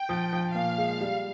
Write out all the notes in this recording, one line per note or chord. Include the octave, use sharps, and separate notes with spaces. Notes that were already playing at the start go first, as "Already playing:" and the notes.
Already playing: G5
F3
F3
A#2 F5
G#3
G3